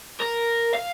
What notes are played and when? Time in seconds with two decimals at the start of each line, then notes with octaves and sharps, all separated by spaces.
0.20 A#4
0.74 F5